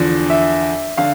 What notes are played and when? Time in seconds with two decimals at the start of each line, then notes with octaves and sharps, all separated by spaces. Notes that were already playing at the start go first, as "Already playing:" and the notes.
Already playing: E2 D3 F3
0.30 E5
0.97 D3 F5